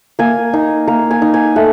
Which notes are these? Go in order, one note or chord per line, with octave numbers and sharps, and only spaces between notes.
A#3 G#5
D#4
A#3 A#5
G#5
D#4
G#5
A3 F#5